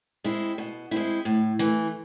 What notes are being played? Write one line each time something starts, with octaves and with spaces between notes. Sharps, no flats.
G#3 C4 E4
B2
G#3 C4 E4
A2
E3 A3